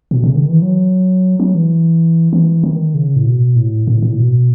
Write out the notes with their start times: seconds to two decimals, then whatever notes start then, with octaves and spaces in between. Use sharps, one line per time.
0.11 B2
0.24 C#3
0.36 D#3
0.49 E3
0.62 F#3
1.40 F#3
1.55 E3
2.33 E3
2.64 D#3
2.95 C#3
3.16 A2
3.25 B2
3.56 A2
3.87 A2
4.02 A2
4.18 B2